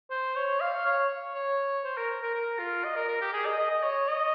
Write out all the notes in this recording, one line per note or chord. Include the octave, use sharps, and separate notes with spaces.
C5
C#5
F5
C#5
C#5
C5
A#4
A#4
A#4
F4
D#5
A#4
A#4
G4
G#4
D#5
D#5
D#5
C#5
D#5